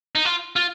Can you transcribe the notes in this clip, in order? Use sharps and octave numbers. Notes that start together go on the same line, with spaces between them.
D#4
F4
F4